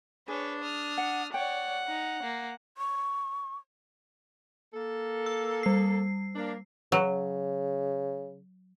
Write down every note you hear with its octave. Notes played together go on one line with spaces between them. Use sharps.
D4 G#4 B4 C#5
D#6 F6
F#5
C#5 D5 F#5 G5
D#4
A#3
C#6
A#3 A4
E6
G3 C7
A#3 D4
C#3 F#3